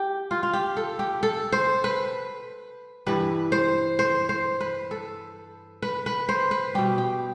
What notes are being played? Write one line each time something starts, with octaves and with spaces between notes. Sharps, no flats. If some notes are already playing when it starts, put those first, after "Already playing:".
Already playing: G4
F4
F4
G4
A4
G4
A4
C5
B4
G2 E3 G3 B4
C5
C5
C5
B4
A4
B4
B4
C5
B4
B2 G3 G4
G4